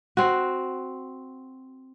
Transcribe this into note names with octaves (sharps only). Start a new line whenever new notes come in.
C4 F#4